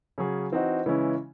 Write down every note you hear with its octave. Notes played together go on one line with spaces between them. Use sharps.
C#3 F#3 C#4 G#4
E3 C4 D#4 F#4
C#3 E3 G#3 C#4 E4